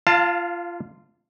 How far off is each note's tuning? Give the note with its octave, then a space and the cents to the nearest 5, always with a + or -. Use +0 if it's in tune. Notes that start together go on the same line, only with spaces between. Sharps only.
F4 -20 F5 +15 A5 +20